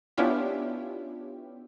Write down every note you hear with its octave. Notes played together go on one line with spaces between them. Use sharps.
B3 C#4 D4 E4 F4 G4